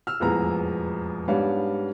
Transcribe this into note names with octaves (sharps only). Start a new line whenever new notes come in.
E6 F6
E1 A1 F2 B3 G#4 A#5
G#2 G3 B3 D4 C#5 F5